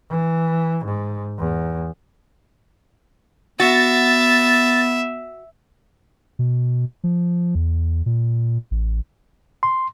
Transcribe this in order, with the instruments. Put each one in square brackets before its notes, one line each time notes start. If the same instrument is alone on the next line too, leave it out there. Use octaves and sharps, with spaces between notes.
[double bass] E3
G#2
E2
[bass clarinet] B3 [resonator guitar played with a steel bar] F#4 [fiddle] E5 [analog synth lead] A6
[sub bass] B2
F3
E2
A#2
A1
[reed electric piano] C6